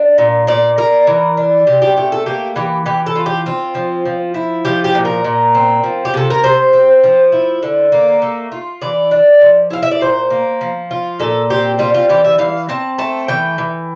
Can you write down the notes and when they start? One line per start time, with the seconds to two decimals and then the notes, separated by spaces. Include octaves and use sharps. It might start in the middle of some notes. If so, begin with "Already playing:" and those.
Already playing: D4
0.18 A#2
0.47 A#2 D5
0.78 D4 A#4
1.07 E3
1.37 D4
1.67 C3 G4
1.82 G4
1.97 A3 G4
2.12 A4
2.26 A#3 G4
2.56 E3 G4
2.86 E3 G4
3.06 A4
3.15 F4
3.26 G4
3.46 C4 F4
3.75 F3
4.05 F3
4.34 E4
4.65 F3 G4
4.84 G4
4.95 A#2
5.05 A#4
5.25 A#2
5.55 C4
5.84 F3
6.05 G4
6.14 C3 A4
6.30 A#4
6.44 C3 C5
6.73 C4
7.04 F3
7.32 E4
7.63 D3
7.92 A#3
8.22 A3
8.52 F4
8.82 E3 D5
9.11 D4
9.42 F3
9.70 E4 F5
9.82 E5
9.91 D5
10.01 A#2 C5
10.30 A#3
10.61 F3
10.91 F4
11.20 A#2 A4
11.50 C4 G4
11.79 G3 F4
11.94 F4
12.09 E3 G4
12.24 E5
12.38 E3 F5
12.69 C4 A5
12.98 A3 A5
13.28 E3 G5
13.58 E3